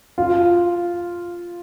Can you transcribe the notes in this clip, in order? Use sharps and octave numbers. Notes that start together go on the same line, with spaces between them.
F4